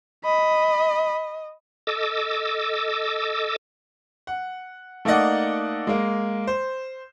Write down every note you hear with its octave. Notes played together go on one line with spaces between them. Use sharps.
D#5 B5
A4 D#5 D6 E6
F#5
A3 A#3 D#4 D5 D#5 F#5
G#3 A#3
C5